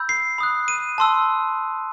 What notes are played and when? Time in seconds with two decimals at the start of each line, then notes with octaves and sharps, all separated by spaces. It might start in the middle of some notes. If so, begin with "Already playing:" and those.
Already playing: B5 E6 G6
0.09 C7
0.38 B5 D#6 F#6
0.68 D#7
0.98 A5 C6 E6